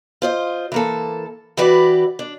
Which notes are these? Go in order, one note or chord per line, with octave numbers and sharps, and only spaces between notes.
F4 C5 D#5
E3 A#3 A4
E3 F#4 G4 B4 D5
D4